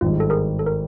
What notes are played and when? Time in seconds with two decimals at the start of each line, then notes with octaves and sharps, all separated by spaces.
0.01 G#1 G2 D#3 G#3 F4
0.20 A4
0.30 G#4 A#4
0.59 A4
0.66 A#4